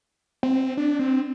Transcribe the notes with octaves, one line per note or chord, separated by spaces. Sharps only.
C4
D4
C4